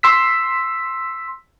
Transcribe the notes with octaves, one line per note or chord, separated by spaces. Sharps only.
C6 E6 B6